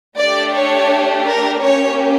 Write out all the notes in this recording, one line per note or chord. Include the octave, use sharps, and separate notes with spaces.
A3 D4 G4 D5
C#5
A#4
A#3 C#4 G4 C#5